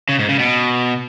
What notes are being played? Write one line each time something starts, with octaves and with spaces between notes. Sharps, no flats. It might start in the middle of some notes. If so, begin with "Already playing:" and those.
C#3
G#2
C#3
B2